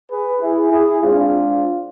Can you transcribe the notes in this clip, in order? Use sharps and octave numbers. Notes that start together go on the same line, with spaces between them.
G#4 B4
E4 G#4
E4 G#4
G#2 G#3 C4 D4 F4